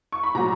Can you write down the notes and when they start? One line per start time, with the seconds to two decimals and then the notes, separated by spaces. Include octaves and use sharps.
0.12 C#6
0.23 B5
0.35 A#2 F#3 A#5